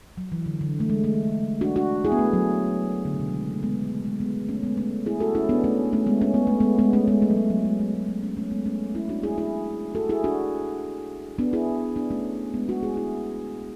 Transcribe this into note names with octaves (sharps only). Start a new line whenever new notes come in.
F#3
E3
D3
D3
A3
G#3
A3
D4 F#4
D4 F#4
E4 G#4
B3
A3
F#3
D3
C#3
B2
F#3
G#3
A3
G#3 B3
A3
G#3
G#3 B3
A3 C#4
G#3 B3
A3 C#4
E4 G#4
F#4 A4
C#4 E4
B3 D4
A3 C#4
A3 C#4
G#3 B3
C#4
B3
A3
G#3 B3
G#3 B3
A3 C#4
G#3 B3
A3
F#3
G#3
F#3
G#3
A3
G#3
A3
A3 C#4
A3 C#4
G#3 B3
A3 C#4
C#4 E4
D4 F#4
E4 G#4
E4 G#4
F#4 A4
E4 G#4
D4 F#4
B3 D4
E4 G#4
B3 D4
A3 C#4
G#3 B3
D4 F#4
E4 G#4
E4 G#4